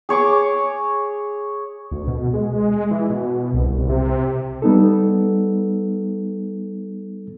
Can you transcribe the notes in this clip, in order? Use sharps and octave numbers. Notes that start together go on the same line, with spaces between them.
G#4 C#5 C#6 D6
D2
B2
G#3
E3
B2
C2
C2
C3
G3 B3 D#4 A4